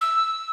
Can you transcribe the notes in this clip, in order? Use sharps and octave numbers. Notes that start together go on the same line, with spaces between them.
E6